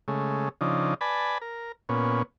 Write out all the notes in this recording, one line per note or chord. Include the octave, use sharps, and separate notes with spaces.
C#3 G#3 A3
C#3 F3 D4 D#4
B4 D5 G#5 A5 B5
A#4
A#2 B3 C#4